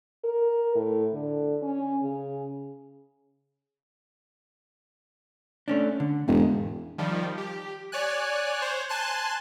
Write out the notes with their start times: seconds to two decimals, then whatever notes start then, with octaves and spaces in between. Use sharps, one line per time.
0.24 A#4
0.75 A2
1.13 D3
1.62 C#4
2.02 C#3
5.68 A3 C#4 D4
6.00 D3
6.28 E1 E2 G#2
6.98 D#3 F3 G3
7.38 G4
7.92 C#5 D5 G#5 F#6
8.62 C5 C#5
8.89 G#5 A5 C6 F#6